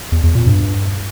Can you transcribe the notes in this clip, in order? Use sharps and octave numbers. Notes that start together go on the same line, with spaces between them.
E2
E2
A#2
G2